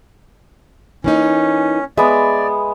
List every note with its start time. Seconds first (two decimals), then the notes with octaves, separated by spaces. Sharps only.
1.04 E3 A#3 C#4 D#4
1.97 G#3 B3 D5 E5